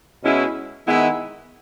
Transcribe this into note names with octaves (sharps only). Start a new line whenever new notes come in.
B2 G#3 C#4 E4
D#3 G#3 B3 E4